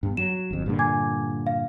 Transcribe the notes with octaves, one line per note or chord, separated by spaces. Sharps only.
G2 B3
F#3 E7
G1 F2
G2 A#2 D3
G#5 D6 G#6
F5